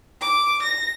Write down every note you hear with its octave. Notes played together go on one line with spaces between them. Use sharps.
D6
A#6